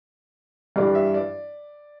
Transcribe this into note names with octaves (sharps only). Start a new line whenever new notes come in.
G2 E3 G3 D4 D5
E5
D5